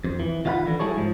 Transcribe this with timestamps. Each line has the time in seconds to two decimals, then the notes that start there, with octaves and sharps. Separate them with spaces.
0.04 F2
0.20 E3
0.45 D#3 F4 D#5 F5 F#5 B5
0.66 D3 E3
0.80 F#3 G3 E4 G#4 A4 C#5
0.96 G#2 F3